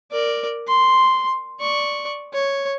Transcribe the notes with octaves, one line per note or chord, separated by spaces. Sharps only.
A#4 D5
C6
D5 C#6
C#5